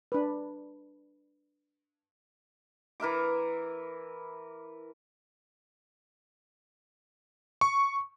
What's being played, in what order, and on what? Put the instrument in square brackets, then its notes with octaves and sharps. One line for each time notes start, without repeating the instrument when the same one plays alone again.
[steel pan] D4 B4
[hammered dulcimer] E3 A#4 E5 D6
[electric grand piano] C#6